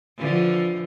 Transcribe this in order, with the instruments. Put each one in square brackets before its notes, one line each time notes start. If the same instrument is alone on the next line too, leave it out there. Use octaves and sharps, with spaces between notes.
[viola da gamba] D3 E3 F3